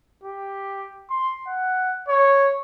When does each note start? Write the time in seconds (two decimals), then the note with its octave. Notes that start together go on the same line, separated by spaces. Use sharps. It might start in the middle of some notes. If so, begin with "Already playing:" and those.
0.24 G4
1.10 C6
1.47 F#5
2.09 C#5